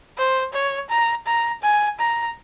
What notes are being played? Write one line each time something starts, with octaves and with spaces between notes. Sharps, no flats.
C5
C#5
A#5
A#5
G#5
A#5